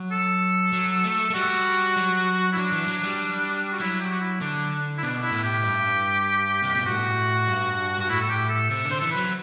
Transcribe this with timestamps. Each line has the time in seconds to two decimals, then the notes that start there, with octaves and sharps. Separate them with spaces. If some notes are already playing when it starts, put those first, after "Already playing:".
Already playing: F#3
0.12 A4
0.73 F#3
1.04 A3
1.30 A3
1.34 G3 F#4
1.96 F#3
2.52 E4
2.57 F#3 D4
2.72 E3
2.87 F#3
3.03 G3
3.72 F#4
3.80 F#3 E4
4.00 G4
4.11 F#4
4.20 E4
4.41 D3 D4
4.98 E4
5.03 B2 D4
5.22 E4
5.32 A2
5.43 G4
5.63 G2
6.62 C3
6.75 B2
6.86 A2 F#4
7.48 G2
7.99 G2 F#4
8.09 A2 E4
8.21 A4
8.29 G4
8.49 A4
8.70 C3 A4
8.85 D3
8.91 C5
9.00 E3 A4
9.11 F#3 B4